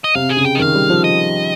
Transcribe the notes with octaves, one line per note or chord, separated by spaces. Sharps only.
D#5
C3 F5
G#4
C#3
G5
D#5
D#3 F5
G3
F3
D#5